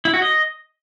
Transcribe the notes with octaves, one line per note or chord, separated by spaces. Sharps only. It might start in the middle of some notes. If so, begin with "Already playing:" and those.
E4
F#4
D#5